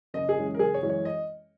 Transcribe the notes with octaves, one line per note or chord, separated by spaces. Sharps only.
F#1 D#5
G#4
F#2 E3 G#3 C#4
A#4
F#1 G#4
C#5
F#2 E3 G#3 C#4
C#5
D#5